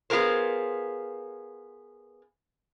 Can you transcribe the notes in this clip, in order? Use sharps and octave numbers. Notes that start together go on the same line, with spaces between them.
B3 F4 G#4 A#4 C5